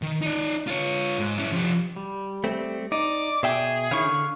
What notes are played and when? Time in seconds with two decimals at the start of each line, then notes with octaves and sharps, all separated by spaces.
0.02 D#3
0.22 D#4 D5
0.67 F4 C#5
1.18 G#2
1.38 C#4 E4
1.52 F3 G4
1.96 G3
2.44 A3 C4
2.92 D#4 D5 D6
3.43 B2 G#4 E5 G5
3.91 D#3 C#4 E4 F5 C#6
4.05 D3